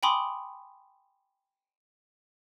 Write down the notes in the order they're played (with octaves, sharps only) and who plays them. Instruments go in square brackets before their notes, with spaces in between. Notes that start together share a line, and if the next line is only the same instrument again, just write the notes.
[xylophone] G5 G#5 B5 C6 D6 D#6